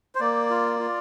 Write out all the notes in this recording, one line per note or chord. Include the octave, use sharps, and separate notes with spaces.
C5
A#3 D5
F4
F4